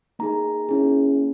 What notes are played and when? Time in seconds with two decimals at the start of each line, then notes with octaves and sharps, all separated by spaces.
0.19 A#3 D#4 G#4 A#5
0.69 A#3 C#4 E4 G#4